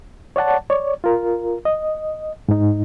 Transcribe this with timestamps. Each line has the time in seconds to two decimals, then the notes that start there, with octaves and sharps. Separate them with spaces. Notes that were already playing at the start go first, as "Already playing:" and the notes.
0.36 C#5 D5 F#5 A5
0.70 C#5 D5
1.04 F4 A#4
1.65 D#5
2.49 G#2 D#4